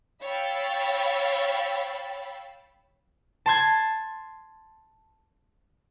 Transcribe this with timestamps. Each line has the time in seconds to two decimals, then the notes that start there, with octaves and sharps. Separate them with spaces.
0.22 C#5 F5 G5 B5 E6 A6
3.46 A5 C6 G#6